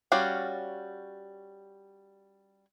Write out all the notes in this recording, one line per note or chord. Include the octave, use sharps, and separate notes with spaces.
G3 C#4 F#4 D5 F5